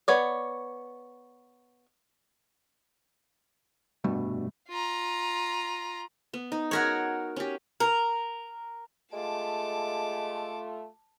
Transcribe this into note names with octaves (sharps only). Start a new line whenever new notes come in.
B3 C#5 D5
F1 G2 B2 G3 A3
F4 A#5
B3
D#4
F#4 A#4 C#5
C#4 G4
A#4
G#3 A3 F4 A5 D6